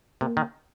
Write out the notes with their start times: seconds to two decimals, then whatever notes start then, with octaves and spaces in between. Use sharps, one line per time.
0.21 C3 A#3
0.37 D#3